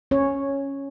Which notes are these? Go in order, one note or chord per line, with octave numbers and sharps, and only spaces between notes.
C#4 C#5